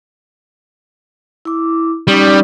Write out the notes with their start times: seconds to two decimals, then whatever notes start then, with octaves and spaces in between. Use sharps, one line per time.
1.45 E4 D6
2.07 G3 C#4 D#4 D5